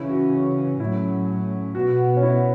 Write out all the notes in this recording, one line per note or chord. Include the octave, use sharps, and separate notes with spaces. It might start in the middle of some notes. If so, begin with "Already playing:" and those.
Already playing: C#3 E3 C#4 E4
F#4
A2 F#3 A3 C#4 E4
B2 B3 F#4
C#4
E4